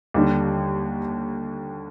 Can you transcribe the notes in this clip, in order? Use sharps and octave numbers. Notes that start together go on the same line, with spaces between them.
D#2 D3 G3 D4 G4